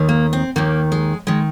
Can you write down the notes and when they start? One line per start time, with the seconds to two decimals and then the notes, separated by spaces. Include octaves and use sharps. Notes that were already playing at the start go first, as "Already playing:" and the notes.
Already playing: D#2 D#3
0.09 A#3
0.33 C4
0.56 D#2 D#3 A#3
0.92 G#3
1.27 D#3 G#3